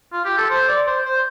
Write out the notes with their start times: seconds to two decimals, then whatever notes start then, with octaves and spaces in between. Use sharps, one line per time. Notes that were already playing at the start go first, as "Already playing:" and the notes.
0.13 F4
0.25 G4
0.37 A4
0.50 C5
0.68 D5
0.87 C5
1.05 C5